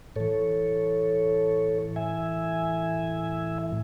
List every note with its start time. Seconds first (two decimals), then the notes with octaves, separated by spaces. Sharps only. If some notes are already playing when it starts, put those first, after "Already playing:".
0.16 A2 E3 A4 C#5
1.96 E5 G#5